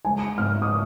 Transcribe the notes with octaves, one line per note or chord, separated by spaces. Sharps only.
G#3 G#5
G#2 F6
D#6